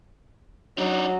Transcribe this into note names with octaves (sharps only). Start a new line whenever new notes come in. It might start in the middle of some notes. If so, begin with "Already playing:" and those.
F#3 D4 D#4